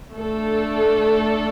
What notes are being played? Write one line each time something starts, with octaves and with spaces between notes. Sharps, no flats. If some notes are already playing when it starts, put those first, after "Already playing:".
A3 D4 A4